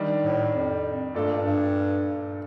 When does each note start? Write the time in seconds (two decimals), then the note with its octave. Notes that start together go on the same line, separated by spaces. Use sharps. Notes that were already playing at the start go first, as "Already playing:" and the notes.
Already playing: D#3 G3 D4
0.23 A2
0.54 F2
1.14 G2 A#2 A3 D4 A4
1.45 G2